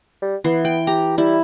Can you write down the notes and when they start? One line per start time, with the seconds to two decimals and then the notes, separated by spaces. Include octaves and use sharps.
0.22 G3
0.44 E3 B3 C6
0.65 G5
0.87 G4 A#5
1.18 G3 E4